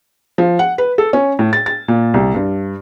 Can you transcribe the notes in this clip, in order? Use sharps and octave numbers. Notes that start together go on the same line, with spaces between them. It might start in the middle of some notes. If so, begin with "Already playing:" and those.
F3
F#5
B4
A4
C#4
A2
A6
A6
A#2
C2
G2